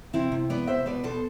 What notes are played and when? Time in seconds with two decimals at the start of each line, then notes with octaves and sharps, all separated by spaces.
0.13 C3 C4 E4
0.32 C3
0.50 B3 B4 D5
0.67 C3 C5 E5
0.86 B2 B4 D5
1.04 B2 A4 C5